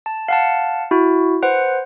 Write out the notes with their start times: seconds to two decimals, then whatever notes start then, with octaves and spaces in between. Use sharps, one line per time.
0.06 A5
0.28 F5 F#5 A5
0.91 E4 F#4
1.43 B4 C5 F#5